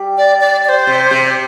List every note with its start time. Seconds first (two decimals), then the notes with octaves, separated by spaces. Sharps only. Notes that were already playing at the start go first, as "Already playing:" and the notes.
Already playing: G3
0.18 D5
0.41 D5
0.65 D5
0.69 C5
0.87 C3
1.11 C3